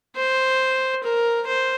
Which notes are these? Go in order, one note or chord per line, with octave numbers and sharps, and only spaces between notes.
C5
A#4
C5